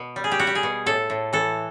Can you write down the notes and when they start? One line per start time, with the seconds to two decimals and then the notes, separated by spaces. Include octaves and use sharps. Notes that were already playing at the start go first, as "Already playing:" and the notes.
Already playing: B2
0.16 G3
0.24 G#4
0.32 G4
0.39 G3 F#4
0.47 G4
0.55 G#4
0.63 B2
0.86 A2 A4
1.10 A2
1.33 E3 A4